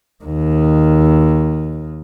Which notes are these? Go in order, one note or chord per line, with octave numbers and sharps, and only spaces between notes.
D#2 D#3